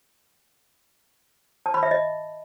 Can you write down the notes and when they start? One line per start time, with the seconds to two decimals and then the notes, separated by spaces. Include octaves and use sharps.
1.66 A5
1.74 B5
1.83 E5
1.91 D#5